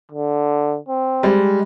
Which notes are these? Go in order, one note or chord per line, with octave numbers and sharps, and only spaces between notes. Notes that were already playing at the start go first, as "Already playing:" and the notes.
D3
C4
G3 G#3